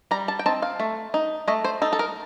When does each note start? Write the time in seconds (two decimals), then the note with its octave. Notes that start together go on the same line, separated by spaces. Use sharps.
0.11 G3 A#5
0.28 A5
0.39 G5
0.46 C4 D#4 A5
0.62 F5
0.80 A3
1.14 D#4
1.48 A3 D#5
1.64 C5
1.82 D#4 A4
1.93 A4
1.99 A#4